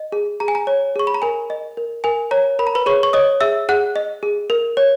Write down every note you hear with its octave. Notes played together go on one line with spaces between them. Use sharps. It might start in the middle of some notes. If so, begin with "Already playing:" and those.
Already playing: D#5
G#4
G#4 A#5
G#5
A#5
C#5
G#4 C#6
B5
A#5
A#4 G#5
D#5
A#4
A#4 G#5
C#5 A#5
A#4 B5
A#5
B4 B5
G#4 C#5 C#6
C#6
C#5 D#5 D#6
G#4 E5 E6
G#4 F#5 F#6
D#5
G#4
A#4
C#5